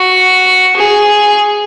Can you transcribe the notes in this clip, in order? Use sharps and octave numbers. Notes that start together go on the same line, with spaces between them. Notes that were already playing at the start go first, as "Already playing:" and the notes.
Already playing: F#4
G#4